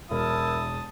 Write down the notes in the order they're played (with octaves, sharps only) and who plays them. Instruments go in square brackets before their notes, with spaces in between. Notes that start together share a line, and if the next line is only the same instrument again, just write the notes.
[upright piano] E1 [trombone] E4 [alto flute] A#4 [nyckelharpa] A5 D#6